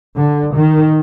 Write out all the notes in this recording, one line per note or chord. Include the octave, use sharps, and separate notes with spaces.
D3
D#3